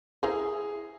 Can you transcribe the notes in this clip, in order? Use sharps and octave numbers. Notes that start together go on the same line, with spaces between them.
E4 G#4 A#4 C5